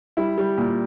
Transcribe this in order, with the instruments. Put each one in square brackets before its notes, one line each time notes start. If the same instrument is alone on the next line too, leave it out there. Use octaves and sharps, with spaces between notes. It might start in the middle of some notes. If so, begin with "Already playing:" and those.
[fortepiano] G3 E4
G3
A#2